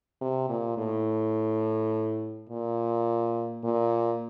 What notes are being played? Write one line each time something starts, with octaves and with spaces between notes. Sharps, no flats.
C3
A#2
A2
A#2
A#2